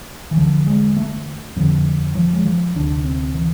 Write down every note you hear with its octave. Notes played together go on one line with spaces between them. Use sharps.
E3
E2 D3 F3
G#3
A3
F2 D3 F3
F3
G#3
F3
D2 C3 D4
C4
E3